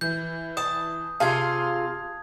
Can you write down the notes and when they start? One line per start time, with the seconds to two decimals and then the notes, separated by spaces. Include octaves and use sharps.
0.01 E3 G6
0.57 A5 D#6
1.20 C3 F4 G#4 F5 A5 C6 G#6